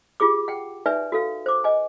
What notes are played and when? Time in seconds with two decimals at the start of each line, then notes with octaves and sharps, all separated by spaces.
0.20 F4 G4 G#4 D6
0.48 F#5 G5
0.86 D#4 B4 D5 E5 G#5
1.12 F#4 A4 F5
1.46 C5 D6
1.64 D#5 G#5